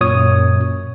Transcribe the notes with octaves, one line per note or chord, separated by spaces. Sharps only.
F#2 A#2 C#5 D#6